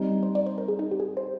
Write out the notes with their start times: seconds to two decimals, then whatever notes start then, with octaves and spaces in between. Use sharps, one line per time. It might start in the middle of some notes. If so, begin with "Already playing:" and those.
Already playing: G3 C4 D#4 G4
0.23 C5
0.35 D5
0.46 C5
0.58 A#4
0.68 G#4
0.79 D#4
0.91 G4
1.00 G#4
1.17 C5